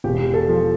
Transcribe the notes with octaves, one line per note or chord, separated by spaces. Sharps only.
E1 G4
A4
F3